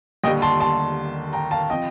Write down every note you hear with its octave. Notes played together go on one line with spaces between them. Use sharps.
D#2 D3 G3 D#5 G5
A5 C6
A5 C6
G5 A#5
F5 A5
F3 C4 D#5 G5